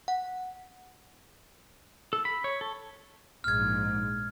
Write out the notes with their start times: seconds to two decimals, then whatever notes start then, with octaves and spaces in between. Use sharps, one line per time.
0.08 F#5
2.13 A4
2.25 B5
2.44 C#5
2.61 A4
3.44 A#1 G#2 F6 G#6